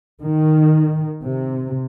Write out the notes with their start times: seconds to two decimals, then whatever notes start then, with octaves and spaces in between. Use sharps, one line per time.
0.22 D#3
1.23 C3